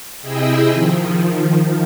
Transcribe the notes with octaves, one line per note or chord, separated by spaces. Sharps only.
C3 E4 G#4 D#5 G5 E6
D#3 F3